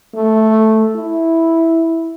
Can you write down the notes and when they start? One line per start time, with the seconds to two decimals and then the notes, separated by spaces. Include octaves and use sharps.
0.15 A3
0.96 E4